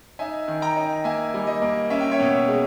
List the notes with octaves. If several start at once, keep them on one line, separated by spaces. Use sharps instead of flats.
D#4 E5 G#5
D#3
G5 A#5
D#4
A#3 E5 G#5
G3
D#5
A#3
C#4 E5
G5
C#5 E5
B2
G#3